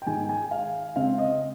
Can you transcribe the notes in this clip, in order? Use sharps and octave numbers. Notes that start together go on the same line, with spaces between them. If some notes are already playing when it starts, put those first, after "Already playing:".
G5
G#2 D#3 G#3 G#5
G#5
F5
C#3 G#3 C4 F5
D#5